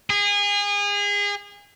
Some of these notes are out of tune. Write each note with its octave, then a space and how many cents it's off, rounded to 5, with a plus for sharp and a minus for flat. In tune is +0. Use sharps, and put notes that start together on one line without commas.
G#4 -30